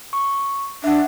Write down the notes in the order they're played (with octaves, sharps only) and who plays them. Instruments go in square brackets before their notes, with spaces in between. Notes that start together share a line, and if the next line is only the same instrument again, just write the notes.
[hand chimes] C#6
[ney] D4 [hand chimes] E5 F#5